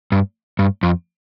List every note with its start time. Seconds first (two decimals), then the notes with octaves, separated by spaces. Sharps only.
0.12 G2
0.59 G2
0.83 F2